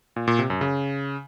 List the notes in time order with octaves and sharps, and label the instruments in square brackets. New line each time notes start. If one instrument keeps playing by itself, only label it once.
[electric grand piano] A#2
A#2
C3
F#2
C#3